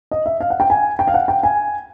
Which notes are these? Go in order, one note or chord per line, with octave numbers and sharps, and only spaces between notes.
D#5
E5
F5
F#5
G5
G#5
G5
F5
F#5
G5
G#5